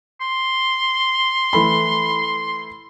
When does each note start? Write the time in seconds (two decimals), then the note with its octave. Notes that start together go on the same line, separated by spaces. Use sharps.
0.21 C6
1.53 E3 A3 B5